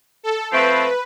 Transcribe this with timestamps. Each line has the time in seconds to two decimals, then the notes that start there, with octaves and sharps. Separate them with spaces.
0.23 A4
0.52 F3 A3 C4 B4